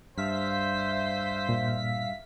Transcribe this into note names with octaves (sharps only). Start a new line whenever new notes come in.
G2 C5 E5 F5 B6
A#2